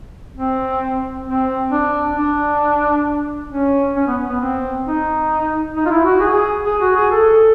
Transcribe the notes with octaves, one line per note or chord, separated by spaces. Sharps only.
C4
C4
D4
D4
C#4
C#4
B3
B3
C4
D#4
D#4
F4
E4
F#4
G#4
G#4
F#4
G#4
A4